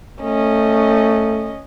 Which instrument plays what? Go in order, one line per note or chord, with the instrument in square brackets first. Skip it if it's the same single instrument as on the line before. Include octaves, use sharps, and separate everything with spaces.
[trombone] A3 [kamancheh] C#4 D#5